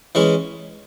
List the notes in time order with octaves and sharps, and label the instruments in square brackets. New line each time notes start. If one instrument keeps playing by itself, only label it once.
[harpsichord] E3 G#3 C#4